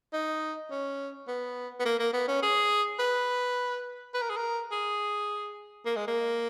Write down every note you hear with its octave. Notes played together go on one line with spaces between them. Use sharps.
D#4
C#4
B3
B3
A#3
A#3
B3
C#4
G#4
B4
B4
A#4
G#4
A#4
G#4
A#3
G#3
A#3